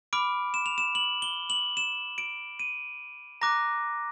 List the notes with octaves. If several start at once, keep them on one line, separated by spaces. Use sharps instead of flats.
B5 D6 F6 D7
E7
F7
E7
F#7
G7
F#7
E7
D7
D#7
A#5 D6 F#6 A#6